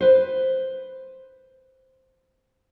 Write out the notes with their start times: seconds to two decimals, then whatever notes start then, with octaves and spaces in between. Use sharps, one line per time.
0.01 B4 C5